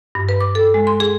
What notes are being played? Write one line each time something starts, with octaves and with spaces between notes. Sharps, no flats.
G2
B4
D6
A4
G#3
C6
G#4